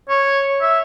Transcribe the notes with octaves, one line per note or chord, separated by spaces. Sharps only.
C#5
E5